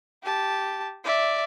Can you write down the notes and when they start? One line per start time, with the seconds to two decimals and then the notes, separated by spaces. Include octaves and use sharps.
0.24 G4 A5
1.04 D5 E5